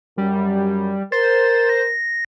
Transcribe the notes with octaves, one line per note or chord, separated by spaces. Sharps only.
F#2 G3
A#4 C5 A6
A#6